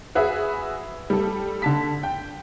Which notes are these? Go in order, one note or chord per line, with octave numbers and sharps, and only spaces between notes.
F#4 G#4 B4 E5
G3 A4
D3 A5 B6
G5